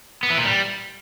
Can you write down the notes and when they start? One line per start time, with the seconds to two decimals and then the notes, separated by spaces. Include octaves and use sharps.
0.23 B3
0.30 E3
0.38 A#2
0.45 G3